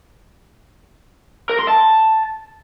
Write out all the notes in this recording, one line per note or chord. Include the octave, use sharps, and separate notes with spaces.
A#4
C6
A5